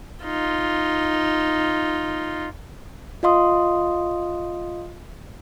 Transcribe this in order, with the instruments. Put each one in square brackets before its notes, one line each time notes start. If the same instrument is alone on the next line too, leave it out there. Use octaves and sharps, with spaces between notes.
[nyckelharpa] D#4 F4
[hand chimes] F4 D#5 F5 C6 D#6